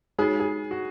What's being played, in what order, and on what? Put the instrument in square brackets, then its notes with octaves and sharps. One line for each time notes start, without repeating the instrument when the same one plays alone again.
[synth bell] G#3 D#4 F#4 [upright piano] G#4
[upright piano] G#4
F#4